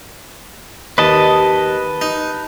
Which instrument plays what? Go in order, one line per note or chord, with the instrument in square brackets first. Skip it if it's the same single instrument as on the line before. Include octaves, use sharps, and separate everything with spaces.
[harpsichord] D#2 [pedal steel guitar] B4 D#5 A5
[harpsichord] D#4